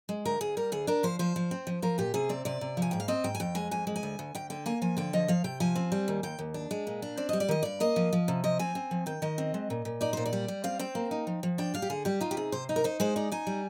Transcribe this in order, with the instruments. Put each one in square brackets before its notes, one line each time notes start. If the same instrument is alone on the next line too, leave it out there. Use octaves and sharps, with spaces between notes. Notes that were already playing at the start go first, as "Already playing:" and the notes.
[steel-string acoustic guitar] G#3
D2 A#4
D2 G#4
G3 A#4
D2 G#4
D4 A#4
F3 C5
F3 C5
F3
C4
F3
F3 A#4
A#2 G4
C3 G#4
C4 D5
C3 D5
C3
F3
G#5
G#2 G5
F5
C4 D#5
G#2 G5
G#5
F2 G5
G#3 G#5
F2 G#5
G#3
G#5
D2
D2
D2 G5
D3 G5
A#3 G#5
F3 G#5
D3 G5
F3 D#5
F3 F5
C3 G5
F3 G#5
C4
G3
D#2
D#2 G5
D#2
D4
G#3
A#2
D4
C4 D5
G3 D#5
D5
D#3 D#5
G2 D5
A#3 D#5
F3
F3
C3
F3 D#5
C4 G#5
C4
F3
D#3 G5
D#3 D#5
C4
G#3
A#2
A#2
D#4 D5
A#2 C5
D5
G3
G3
C4 F5
C4 G5
A#3
D#4
F3
F3
D4 G5
G3 F5
G4
D3 G#4
G3 G4
D#4 F4
G4
C3 G#4
C3 C5
D#4
A#4
D#4 C5
G#3 C5
D#4 D5
D#4 G#5
G3